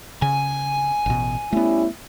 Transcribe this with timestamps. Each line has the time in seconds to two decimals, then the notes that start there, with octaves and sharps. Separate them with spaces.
0.22 C#3 G#5
1.06 A1 B2
1.53 G3 A3 B3 C#4 E4